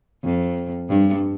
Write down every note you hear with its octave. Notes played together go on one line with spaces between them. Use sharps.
F2
G2